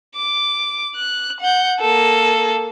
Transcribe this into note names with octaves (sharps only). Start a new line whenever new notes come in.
D6
F#6
F#5 G6
A#3 A4